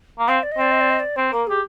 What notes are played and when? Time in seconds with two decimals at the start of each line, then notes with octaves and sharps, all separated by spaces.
0.19 A#3
0.28 C4 F5
0.43 D5
0.52 D#5
0.57 C4 D5
0.71 D#5
0.81 D5
0.90 D#5
1.00 D5
1.16 C4 C5
1.32 A#3 A#4
1.47 G4 G#4